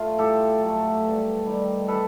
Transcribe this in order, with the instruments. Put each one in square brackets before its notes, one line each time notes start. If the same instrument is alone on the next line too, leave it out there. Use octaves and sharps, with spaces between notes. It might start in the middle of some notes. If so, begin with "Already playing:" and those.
Already playing: [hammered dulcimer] A3 F4
A2 G4 A4
F#3 A3
G2
D#3 G3
A4 B4